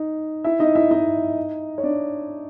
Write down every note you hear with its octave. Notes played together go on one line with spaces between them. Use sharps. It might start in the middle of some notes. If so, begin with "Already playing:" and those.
Already playing: D#4
E4 E5
D#4 D#5
E4 E5
D#4 D#5
C#5
D4 D5